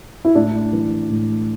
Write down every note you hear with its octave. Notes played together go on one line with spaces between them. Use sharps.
E4
A2 D4
E3
A2